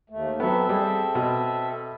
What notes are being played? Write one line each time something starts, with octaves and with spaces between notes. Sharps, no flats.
D#2 A3
F#3 B3 C4 A4 E5
G3 G#4
B2